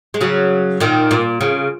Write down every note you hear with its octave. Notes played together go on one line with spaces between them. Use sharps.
G#3
C#3 F#3
A#2 D#3
A#2
C#3